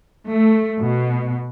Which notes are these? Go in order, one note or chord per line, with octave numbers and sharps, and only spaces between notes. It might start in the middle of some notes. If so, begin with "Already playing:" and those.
A3
B2